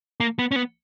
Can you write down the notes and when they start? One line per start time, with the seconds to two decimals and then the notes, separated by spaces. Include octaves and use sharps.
0.20 A#3
0.39 B3
0.51 C#4
0.56 B3